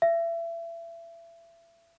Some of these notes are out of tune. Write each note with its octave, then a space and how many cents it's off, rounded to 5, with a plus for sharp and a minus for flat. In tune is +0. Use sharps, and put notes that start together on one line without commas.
E5 +30